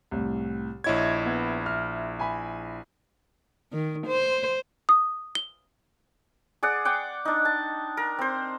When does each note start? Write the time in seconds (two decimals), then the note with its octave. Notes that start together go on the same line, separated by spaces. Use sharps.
0.11 C2 A2
0.84 A#1 E4 C#5 D#5 G#6
1.25 B3
1.66 F6
2.19 G#5 B5
3.72 D#3
4.07 C5
4.89 D#6
5.35 G7
6.63 G#4 D5 F#5
6.85 F#5 G5 D6
7.25 D4 D#4
7.45 A5
7.97 A#4
8.19 C4 C5